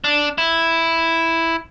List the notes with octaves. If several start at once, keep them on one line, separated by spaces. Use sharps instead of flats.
D4
E4